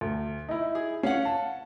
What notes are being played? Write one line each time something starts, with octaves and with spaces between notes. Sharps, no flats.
D2
D#4 E4
G#4
C#4 F5 F#5
A5